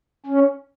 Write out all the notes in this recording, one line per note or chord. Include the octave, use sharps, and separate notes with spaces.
C#4